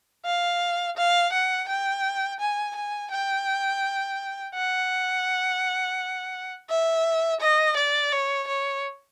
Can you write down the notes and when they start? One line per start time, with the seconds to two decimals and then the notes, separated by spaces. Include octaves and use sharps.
0.26 F5
0.97 F5
1.33 F#5
1.69 G5
2.40 G#5
2.76 G#5
3.12 G5
4.55 F#5
6.69 E5
7.41 D#5
7.77 D5
8.12 C#5
8.48 C#5